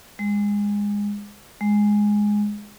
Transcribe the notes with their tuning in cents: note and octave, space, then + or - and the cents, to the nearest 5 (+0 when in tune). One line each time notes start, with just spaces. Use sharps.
G#3 -20
G#3 +0